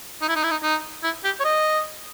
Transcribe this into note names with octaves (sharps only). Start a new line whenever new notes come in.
D#4
E4
D#4
E4
D#4
D#4
E4
G4
C#5
D#5